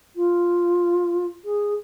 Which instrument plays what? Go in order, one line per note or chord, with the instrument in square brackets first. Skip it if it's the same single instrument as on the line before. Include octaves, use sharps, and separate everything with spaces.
[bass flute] F4
G#4